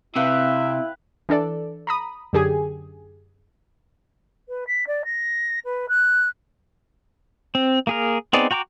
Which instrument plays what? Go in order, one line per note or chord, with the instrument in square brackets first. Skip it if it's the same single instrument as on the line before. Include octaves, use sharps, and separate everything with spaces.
[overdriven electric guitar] C3 [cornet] E4 [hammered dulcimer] B4 F5 G5 [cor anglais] E5
[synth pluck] E3 D4 A4 D5
A#5 B5 D#6
F#2 D3 G4 G#4 G#5
[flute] B4
B6
D5
A#6
B4
F#6
[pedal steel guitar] C4
A#3 G#4 A#4
B3 C4 D#4 G#4 D5
F#4 G5 A#5 C#6 D6